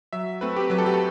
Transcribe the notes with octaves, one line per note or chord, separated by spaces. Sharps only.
F#3 E5
A3 C4 B4
G4
F#3 B4
A4
G4
A4